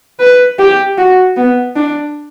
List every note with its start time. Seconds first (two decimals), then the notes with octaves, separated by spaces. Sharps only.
0.20 B4
0.59 G4
0.98 F#4
1.36 B3
1.76 D4